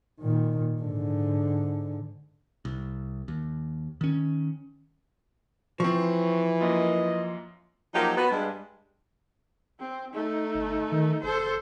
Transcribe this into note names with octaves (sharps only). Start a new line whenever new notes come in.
A#2 D#3
G#2 D3
C2
D#2
D#3 C#4
E3 F3 C4 C#6
F#2 A#3 F4 D#5
F3 F#3 A#3 D#4 F4 G4
B3 F#4 B4
G2 G#3
C4
A3 D#4
G1
D#3
F#1 A4 C5